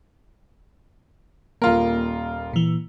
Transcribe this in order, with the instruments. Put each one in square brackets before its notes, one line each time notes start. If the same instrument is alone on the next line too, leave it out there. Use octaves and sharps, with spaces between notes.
[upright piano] D#1 F4 A#4 [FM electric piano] A#3
[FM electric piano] A#2 E3